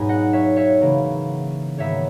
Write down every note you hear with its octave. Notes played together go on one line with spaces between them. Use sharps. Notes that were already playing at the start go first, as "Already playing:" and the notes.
Already playing: G#2 B2 F#3 B3 D#4 G#5
D#5 F#5
C#5 E5
C#5 E5
C#3 E3 A#3
G#2 D#3 F#3 B3 C#5 E5